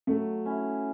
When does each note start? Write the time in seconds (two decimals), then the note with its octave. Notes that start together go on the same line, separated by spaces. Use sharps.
0.07 F#3 A3
0.45 C#4 E4